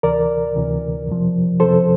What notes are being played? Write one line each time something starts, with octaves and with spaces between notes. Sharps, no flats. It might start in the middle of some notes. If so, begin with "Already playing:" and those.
D2 C3 E3 A#4 D5
D2 C3 E3
F2 C3 F3
F2 C3 F3 A4 C5